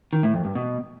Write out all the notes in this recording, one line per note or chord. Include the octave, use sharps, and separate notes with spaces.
D#3
A2
F2
G2
B2